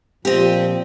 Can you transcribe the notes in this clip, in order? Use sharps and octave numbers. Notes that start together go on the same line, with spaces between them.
A#2 F3 C4 G4 D#5